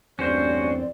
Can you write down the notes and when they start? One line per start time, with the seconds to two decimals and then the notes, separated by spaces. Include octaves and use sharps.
0.19 A1 E2 G2 C4 C#4 F#4 C5 D5